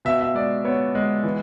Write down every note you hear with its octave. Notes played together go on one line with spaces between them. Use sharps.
B2 E5
E5
G#3 D5
B3 C#5
G#3
E3